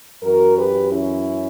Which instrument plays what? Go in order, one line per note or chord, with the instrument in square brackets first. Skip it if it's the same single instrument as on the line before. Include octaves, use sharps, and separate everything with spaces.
[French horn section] F#2 E3 F#4 A#4
G4 B4
C#4 E4